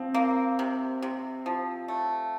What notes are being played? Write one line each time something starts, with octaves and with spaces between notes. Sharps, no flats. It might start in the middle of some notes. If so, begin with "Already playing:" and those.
Already playing: F3 C4
A#3
C3
C3
F3
A3